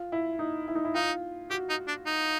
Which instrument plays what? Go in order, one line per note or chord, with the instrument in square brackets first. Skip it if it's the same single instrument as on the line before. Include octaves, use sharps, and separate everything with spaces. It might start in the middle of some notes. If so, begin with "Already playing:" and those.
Already playing: [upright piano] F4
E4
D#4
E4
D#4
E4
[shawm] D#4 [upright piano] F4
[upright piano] F#4 [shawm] G4
[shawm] D#4
D4
D#4